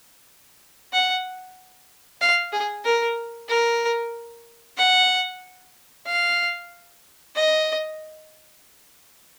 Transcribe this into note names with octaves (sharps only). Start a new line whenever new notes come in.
F#5
F5
G#4
A#4
A#4
F#5
F5
D#5